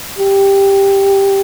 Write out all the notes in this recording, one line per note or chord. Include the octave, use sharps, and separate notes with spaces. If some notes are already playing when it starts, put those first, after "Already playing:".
G4